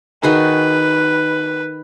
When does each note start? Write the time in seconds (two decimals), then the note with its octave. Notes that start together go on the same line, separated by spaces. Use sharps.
0.23 D#3 F#4 G#4 B4